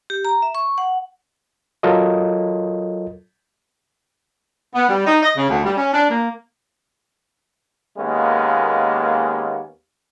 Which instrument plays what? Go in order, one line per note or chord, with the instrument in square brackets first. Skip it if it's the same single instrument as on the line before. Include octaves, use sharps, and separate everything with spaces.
[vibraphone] G4
A#5
E5
C#6
F#5
[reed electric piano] F#3 F4 A4 A#4 C#5 D#5
[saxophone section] B3
G3
D#4
D#5
C#3
D2
G3
C#4
D4
A#3
[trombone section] D#2 G#3 A#3 B3 C#4